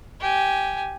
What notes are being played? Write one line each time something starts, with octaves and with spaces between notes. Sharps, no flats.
G4 G#5